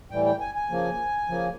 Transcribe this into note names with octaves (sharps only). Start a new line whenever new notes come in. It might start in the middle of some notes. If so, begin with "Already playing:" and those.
A2 E3 G3 G5
G5
G#5
G#5
C#3 F3 A#3
C#3 F3 A#3